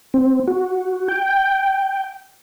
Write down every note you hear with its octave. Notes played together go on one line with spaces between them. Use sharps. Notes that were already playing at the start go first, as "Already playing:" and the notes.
C4
F#4
G5